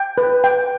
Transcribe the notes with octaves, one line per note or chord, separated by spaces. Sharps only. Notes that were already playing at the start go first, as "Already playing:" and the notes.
Already playing: G5
B4
G5